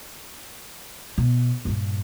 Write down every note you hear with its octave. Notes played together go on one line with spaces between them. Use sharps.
B2
G2 A#2